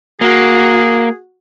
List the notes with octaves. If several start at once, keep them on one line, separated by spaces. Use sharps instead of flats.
A#3 F#4 G#4